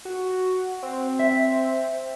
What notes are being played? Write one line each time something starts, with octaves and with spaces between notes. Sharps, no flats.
F#4
C4
E5